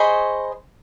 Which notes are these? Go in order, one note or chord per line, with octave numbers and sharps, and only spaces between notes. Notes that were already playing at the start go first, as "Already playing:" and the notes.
Already playing: G#4 C5 D#5 B5 C#6